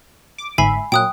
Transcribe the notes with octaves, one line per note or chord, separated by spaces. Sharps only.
D6
G1 G#2 E5 G#5 B5 C7
A#2 F#3 A#3 G5 D#6 F#6